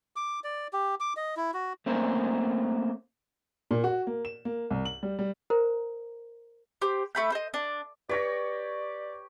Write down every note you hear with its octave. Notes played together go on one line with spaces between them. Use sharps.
D6
D5
G4
D6
D#5
E4
F#4
A3 A#3 C4 C#4
A#2
F#4
A#3
E7
A#3
C2
F#7
G3
G3
A#4 C5 A#5
G4 C5
A3 B5 G6
C5 D#5
D4
G4 B4 C#5 D5 A#6